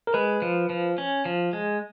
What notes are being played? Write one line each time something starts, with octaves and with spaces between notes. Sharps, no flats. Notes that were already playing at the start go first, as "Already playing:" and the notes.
A#4
G#3 B4
F3
F3
C#4
F3
G#3